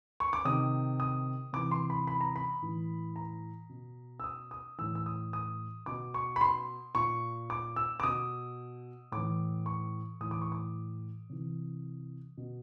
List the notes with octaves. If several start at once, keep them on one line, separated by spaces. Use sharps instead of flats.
C#6
D6
C3 D#3 D#6
D#6
C3 E3 D6
C6
B5
B5
A#5
B5
A2 E3
A#5
B2
E6
D#6
D#6
A2 E3 E6
E6
D#6
D#6
B2 D6
C#6
B5
C6
A#2 C#6
D6
E6
D6
B2 D#6
A2 E3 D6
C#6
A2 E3 D#6
D6
C#6
D6
C3 E3
B2